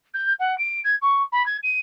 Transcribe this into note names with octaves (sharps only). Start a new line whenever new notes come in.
G6
F#5
D7
G#6
C#6
B5
G#6
D#7